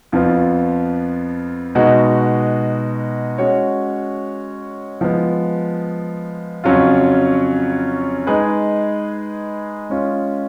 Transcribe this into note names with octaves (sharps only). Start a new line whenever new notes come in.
F2 F3 B3 F4
B2 G#3 B3 D#4 F#4
G#3 C#4 F#4 C#5
F3 G#3 B3
F2 C#3 F#3 C#4 F4
G#3 D#4 G#4 B4
G#3 C#4 F4